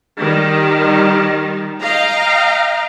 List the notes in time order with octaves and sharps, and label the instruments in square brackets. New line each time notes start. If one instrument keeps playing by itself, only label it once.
[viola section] D#3 G3
D#5 F5 G5 A#5